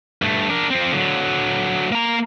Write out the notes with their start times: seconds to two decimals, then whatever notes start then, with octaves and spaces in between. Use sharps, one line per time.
0.22 G2 A3
0.50 D4 A#4
0.70 F3 C4
0.92 D3 F#3
1.92 A#3 A#5